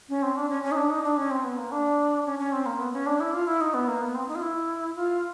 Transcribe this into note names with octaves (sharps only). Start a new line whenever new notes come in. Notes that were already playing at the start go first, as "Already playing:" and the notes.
C#4
C4
D4
C#4
C#4
D#4
D4
D#4
D4
C#4
C4
B3
A#3
D4
C#4
C#4
C4
A#3
B3
C#4
D4
E4
F4
E4
D#4
B3
A#3
B3
C4
D#4
F4
E4
F4